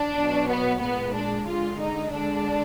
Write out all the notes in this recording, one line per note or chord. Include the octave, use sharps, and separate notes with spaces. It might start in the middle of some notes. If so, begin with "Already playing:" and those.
Already playing: D4
B2 F#3
B3
A#2 G#3 B3
D4
D3 G#3 F4
D#4
D3 G#3 D4